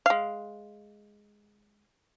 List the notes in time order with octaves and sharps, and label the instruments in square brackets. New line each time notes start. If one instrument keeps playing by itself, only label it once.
[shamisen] G#3 F5